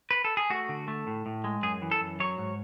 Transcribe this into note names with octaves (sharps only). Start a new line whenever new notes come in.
B4
A4
G#4
A3 F#4
D3
A3
A2
A2
G#3
F#2 G#4
E3
A4
F#2
F#3 C#5
G#2